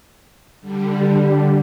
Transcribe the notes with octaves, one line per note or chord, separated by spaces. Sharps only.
D3 G3